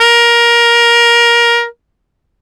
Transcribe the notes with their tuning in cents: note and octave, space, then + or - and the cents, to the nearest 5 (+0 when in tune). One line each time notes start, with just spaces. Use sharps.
A#4 +20